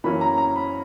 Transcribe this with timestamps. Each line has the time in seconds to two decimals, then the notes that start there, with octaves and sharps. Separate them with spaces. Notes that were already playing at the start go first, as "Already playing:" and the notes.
0.04 F#2 E3 A#3 C#4 B5
0.21 A#5
0.38 A#5
0.56 B5